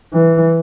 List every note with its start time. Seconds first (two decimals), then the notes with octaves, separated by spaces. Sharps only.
0.14 E3